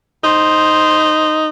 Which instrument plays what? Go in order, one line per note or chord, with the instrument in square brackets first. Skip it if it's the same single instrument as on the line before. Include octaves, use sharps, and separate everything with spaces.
[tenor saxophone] D#4 [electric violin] C5